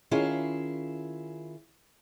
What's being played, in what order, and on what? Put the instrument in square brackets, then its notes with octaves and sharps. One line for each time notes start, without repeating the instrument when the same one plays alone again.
[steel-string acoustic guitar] D#3 C#4 E4 F4 G#4